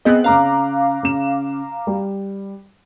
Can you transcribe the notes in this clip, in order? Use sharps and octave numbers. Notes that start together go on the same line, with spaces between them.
B3 C4 G#4 D#5 F#6
C#3 C#4 F5 A#5 D6
C#3 E7
G3